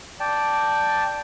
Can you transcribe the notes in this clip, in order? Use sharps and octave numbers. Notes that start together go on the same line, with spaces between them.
D5 G5 A5